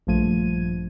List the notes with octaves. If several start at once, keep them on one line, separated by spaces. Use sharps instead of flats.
A#1 G2 F3 A3 G#6 D#7